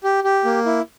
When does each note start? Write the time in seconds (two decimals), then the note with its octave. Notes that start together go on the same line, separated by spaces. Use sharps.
0.04 G4
0.24 G4
0.45 A#3
0.66 E4